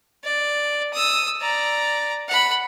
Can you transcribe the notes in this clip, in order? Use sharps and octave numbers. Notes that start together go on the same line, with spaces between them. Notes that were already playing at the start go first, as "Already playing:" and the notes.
D5
D#6 E6
D5 A#5
F#5 B5